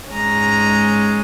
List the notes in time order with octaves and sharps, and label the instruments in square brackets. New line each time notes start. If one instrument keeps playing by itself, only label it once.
[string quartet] G#2 G#3 C#4 A#5